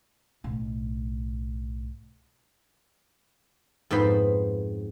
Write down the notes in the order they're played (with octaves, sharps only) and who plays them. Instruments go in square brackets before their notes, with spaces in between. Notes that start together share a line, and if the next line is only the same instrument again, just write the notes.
[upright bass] B1 A2
[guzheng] F2 G#2 B3 C5 B5